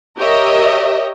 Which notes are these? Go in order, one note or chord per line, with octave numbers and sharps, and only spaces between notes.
G4 A#4 C#5 D#5 E5